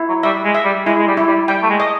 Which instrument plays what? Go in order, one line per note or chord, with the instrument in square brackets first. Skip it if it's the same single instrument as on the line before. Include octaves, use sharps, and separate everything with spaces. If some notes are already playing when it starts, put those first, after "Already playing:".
Already playing: [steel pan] E4
[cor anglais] F#3
[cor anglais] G3 [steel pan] E5
[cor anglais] G#3
[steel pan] E5
[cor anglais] G3
[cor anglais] G#3 [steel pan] E4
[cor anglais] G#3
G3
[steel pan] E4
[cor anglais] G3
[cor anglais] G3 [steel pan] G5
[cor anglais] A3
G#3
[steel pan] D#5